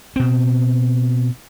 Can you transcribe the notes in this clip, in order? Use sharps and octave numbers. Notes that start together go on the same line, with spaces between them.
B2 C4